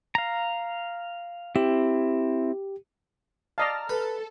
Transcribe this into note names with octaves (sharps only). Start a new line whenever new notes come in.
F5 A#5
C4 E4 G4
D5 D#5 F5 A5 A#5 F6
A4 B4